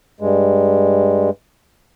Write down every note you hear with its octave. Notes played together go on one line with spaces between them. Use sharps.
G2 G#3